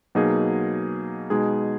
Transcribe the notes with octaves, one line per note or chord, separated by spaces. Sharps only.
B2 F#3 A#3 D#4 G#4
B2 G#3 D#4 G#4